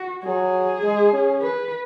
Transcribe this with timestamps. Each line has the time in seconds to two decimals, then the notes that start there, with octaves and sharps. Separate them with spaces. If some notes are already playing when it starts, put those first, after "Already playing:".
Already playing: F#4
0.24 F#3 G#4
0.83 G#3
1.13 C#4
1.42 B4